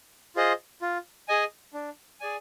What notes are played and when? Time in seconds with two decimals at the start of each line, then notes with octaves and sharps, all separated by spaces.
0.36 F4 G#4 C5 D#5
0.82 F4
1.28 G#4 D#5 G#5
1.74 D4
2.20 G#4 D5 G#5